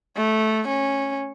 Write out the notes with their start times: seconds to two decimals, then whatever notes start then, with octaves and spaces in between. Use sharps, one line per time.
0.16 A3
0.68 C#4